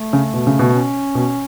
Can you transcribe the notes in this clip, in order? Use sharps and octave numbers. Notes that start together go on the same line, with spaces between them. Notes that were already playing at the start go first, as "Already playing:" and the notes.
Already playing: A3
C#3
B2
C#3
B2
C#4
B2